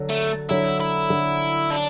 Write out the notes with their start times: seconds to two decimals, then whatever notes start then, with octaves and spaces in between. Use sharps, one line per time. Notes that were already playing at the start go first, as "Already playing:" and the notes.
Already playing: D3 F#3
0.10 A3
0.49 D3 F#3 E4
0.80 E4
1.10 D3
1.70 D4